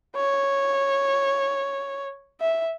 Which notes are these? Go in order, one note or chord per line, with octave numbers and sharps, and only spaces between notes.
C#5
E5